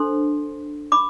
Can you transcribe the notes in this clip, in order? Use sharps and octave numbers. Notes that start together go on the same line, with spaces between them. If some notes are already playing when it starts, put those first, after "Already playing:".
Already playing: D4 A4 C5 C6
B5 D6